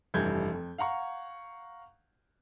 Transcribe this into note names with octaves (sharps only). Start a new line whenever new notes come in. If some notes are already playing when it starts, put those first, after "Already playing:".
F1 G2 E3 G3 G6 G#6
F2
F5 F#5 A#5 C#6